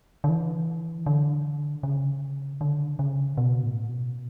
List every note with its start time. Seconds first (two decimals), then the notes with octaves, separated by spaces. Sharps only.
0.24 D3
0.29 E3
1.06 D3
1.83 C#3
2.61 D3
2.99 C#3
3.37 B2
3.63 A2
3.89 B2